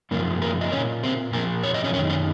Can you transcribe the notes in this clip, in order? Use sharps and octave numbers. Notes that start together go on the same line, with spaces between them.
F#2 C#3 F3 A#3 A#4
A#3 A#4
D#5
F3 C#4 C#5
A#2
C4 C5
A#2 F3 A#3 A#4
C#5
D#5
C#4 C#5
F#2 D#3 C#4 C#5
C#4 C#5